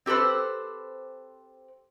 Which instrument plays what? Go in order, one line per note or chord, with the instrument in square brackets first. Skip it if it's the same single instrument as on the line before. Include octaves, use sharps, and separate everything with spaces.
[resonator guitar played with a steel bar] C4 G4 A4 B4 C5